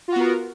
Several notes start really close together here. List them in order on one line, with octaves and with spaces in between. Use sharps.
F4 F#4 B3 A#4